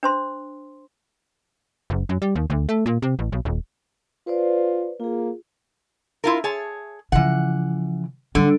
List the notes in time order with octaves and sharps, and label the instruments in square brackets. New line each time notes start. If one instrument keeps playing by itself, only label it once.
[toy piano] D4 C5 C6
[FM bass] F#1
F#2
G3
D#2
D2
A3
A#2
C3
A1
B1
D#1
[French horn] F4 [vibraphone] B4 C5 D5
[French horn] A#3 [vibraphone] F4 G#4
[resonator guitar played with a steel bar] E4 F4 A#4
G#4 C#5 A5
[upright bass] C#3 F3 [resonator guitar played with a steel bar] E3 F#5
[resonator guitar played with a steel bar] D3 [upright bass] G3